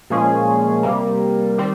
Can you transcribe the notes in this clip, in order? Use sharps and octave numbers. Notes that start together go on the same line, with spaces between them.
A#2 F3 G#3 C#4 G#4
C3 G3 A#3
D#3 G3 C4